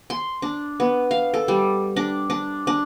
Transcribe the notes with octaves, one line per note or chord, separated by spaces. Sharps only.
C6
D4
B3
F5
A4
G3
D4
D4
D4